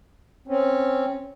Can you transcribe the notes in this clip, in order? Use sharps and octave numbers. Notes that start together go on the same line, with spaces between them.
C4 C#4